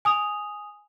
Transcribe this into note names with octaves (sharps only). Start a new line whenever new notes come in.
G#5 D#6 F7